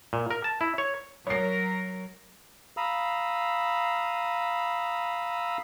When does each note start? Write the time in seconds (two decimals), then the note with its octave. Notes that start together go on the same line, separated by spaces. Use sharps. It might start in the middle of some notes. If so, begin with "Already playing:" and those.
0.13 A#2
0.31 A#4
0.44 A5
0.61 E4
0.78 C#5
1.27 F#3 A#4 C#5 C7
2.77 F5 A#5 B5 D#6 E6